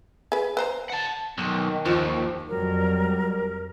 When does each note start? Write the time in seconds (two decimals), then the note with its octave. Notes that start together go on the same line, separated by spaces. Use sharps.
0.32 G#4 B4
0.57 B4 C5 A#5
0.90 F#5 A5
1.38 B1 D#3
1.86 D#2 F3 G#5
2.49 F2 F#3 G3 A#4